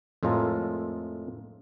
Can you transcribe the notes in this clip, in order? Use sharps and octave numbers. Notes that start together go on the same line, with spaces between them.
F2 A2 G#3 F4 A4 A#4